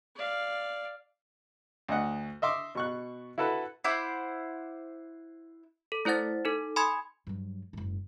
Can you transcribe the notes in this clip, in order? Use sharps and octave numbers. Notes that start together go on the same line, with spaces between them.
D5 F5
D2 D#5 F#5
D#5 E5 C6 D6
B2 C#6 F#6
E4 F#4 A4 B4 B5
E4 C5 F#5 D6
A4
A3 E4 C5 F#5 A6
D#4 A4
G#5 B5 C6 D#6 G#6
G2 F#3
F#1 G#2